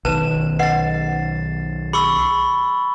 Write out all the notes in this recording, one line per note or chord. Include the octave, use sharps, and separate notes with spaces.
B1 D#3 B4 C5 A5 E7
B4 D#5 F#5 A6 C7
G#4 B5 C#6 E6